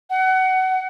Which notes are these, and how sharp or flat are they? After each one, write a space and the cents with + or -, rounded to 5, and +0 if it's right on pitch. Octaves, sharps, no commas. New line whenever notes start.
F#5 +25